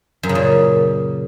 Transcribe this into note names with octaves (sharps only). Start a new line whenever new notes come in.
F#2
C#3
A#2